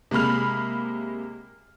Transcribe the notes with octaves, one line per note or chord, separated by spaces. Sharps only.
C3 G#3 A#3 B5 F6